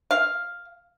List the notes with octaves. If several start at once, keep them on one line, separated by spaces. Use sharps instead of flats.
F5